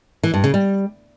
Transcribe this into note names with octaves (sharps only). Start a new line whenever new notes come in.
E3
G2
C#3
G3